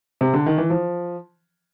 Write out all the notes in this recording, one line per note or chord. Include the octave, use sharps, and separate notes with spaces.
C3
D3
D#3
E3
F3